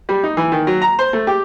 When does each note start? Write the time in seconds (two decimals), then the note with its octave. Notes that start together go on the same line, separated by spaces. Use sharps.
0.09 G3
0.24 D#4
0.37 E3
0.52 D#3
0.67 F#3
0.82 A#5
0.99 C5
1.13 A3
1.27 G4